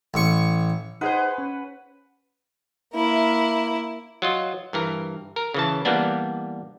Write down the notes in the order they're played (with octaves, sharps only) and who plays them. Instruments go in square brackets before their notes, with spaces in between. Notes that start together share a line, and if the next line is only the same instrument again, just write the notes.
[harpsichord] A1 C#6
[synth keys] D#4 G#4 C5 [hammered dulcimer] B4 F#5
[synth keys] C#4
[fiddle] A#3 E4
[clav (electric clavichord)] F#3 F4 D#5
G2 E3 A#4
A#4
C#3 E3 A5
E3 G3 A#3 B3 D4